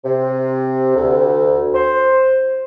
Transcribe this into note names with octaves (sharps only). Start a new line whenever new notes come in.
C3
D2
C5